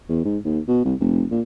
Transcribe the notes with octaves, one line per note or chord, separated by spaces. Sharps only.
E2
G#2
D#2
B2
C2
F1
A#2